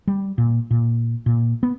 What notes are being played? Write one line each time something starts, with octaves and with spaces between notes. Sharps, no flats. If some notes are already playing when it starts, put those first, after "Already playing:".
G3
A#2
A#2
A#2
B3